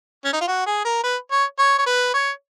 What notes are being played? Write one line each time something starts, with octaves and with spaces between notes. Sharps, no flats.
C#4
D#4
F4
F#4
G#4
A#4
B4
C#5
C#5
C#5
B4
C#5